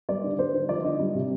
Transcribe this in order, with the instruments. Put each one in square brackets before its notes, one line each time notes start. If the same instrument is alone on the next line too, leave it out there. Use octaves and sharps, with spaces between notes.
[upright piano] G3 D5
D3
G3 C5
D3
F3 D5
D3 D#5
G3
C3